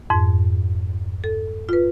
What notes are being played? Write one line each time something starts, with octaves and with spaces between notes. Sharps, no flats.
F2 G#2
A4
F4 B4